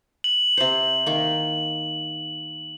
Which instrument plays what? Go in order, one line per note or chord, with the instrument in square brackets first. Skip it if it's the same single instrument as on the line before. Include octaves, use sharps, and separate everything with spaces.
[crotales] F#7
[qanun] C3 C5
D#3 A#3